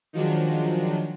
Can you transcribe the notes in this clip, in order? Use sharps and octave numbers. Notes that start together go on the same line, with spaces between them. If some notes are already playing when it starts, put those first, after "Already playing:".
D#3 F3 F#3 G#3 D4